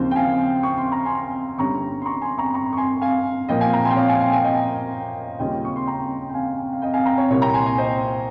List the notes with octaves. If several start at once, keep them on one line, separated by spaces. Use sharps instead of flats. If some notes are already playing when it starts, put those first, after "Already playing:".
Already playing: D#2 C#3 F3 C4 C5
G5
F5 G#5
C#6
C6
A#5
G#5 C6
G1 G2 G3 C#4 A#5 C#6
C6
A#5 C#6
G#5 C6
A#5 C#6
A#5 C#6
C#6
G#5 C6
F5 G#5
A#2 F3 A#3 D#4 D#5 G5
F5 G#5
G5 A#5
G#5 C6
G5
C#5 F5
F5 G#5
G#5 C6
F5 G#5
D#5 G5
D#2 C#3 G3 C#4 F4 D#5 G5
C#6
C6
G5 A#5
G5
F5 G#5
F5
D#5 G5
F5 G#5
G5 A#5
C#5
C2 A#2 G3 A#3 C#5
G5 A#5
G#5 C6
G#5 C6
C5 D#5